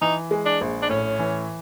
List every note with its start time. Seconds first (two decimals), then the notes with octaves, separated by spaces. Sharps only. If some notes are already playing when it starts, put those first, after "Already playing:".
0.02 E3 D#4
0.31 G#3
0.45 D4
0.61 A#1
0.82 D4
0.89 A2 C#4
1.19 E3